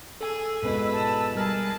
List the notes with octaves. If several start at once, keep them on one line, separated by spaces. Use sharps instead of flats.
G#4 A4 G#5 E6
G#2 B2 E4 B4
A5 E6
G3 G#4 A#4 A5 B5 F6